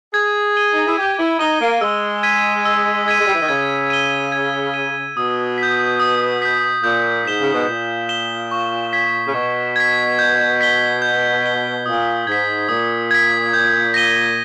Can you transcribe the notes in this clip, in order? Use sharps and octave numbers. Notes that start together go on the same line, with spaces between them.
G#4 G#6
D#7 G7
D#4
E4
G4 G#6
E4
D#4 D#7 G7
A#3
G#3 E6
G#6 B6 D#7
E6
G#6 B6 D#7
G#3
G3
E3
D#3
C#3 G#6
D#7 G7
G#6
D#7 G7
B2 D#6
B6
G6
D#6
G6 B6
A#2 G6
G#2 B6 E7 G7
C#3
B2
A#2 G6
B6 E7 G7
C#6
G#6 B6
C#3
B2 C#6
G#6 B6
G6
B6 G7
G6
B6 G7
A#2 D#6
G#2 G#6 B6
A#2 D#6
G#6 B6
G6
A#6 D#7 G7